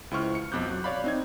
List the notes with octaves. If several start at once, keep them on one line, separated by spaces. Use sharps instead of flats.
C#2 E4 C5 C#6 F6
C#7
B1 F2 D6 F#6 G6
F#3
C#5 D5 F5 B5
C4 D#4 G#6